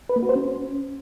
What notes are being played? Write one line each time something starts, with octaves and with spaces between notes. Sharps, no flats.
B4
A#3
F#4
C5
C#4